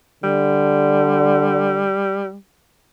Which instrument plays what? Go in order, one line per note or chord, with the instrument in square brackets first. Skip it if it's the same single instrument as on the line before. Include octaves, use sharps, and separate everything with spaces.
[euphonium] D3 [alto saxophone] G3